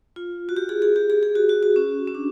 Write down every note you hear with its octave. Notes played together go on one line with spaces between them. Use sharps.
F4
F#4
G4
G#4
G#4
G4
G#4
G#4
F#4
F#4
F#4
C#4
C#4
D4